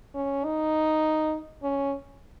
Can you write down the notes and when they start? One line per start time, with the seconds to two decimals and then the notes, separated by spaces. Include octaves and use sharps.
0.14 C#4
0.45 D#4
1.63 C#4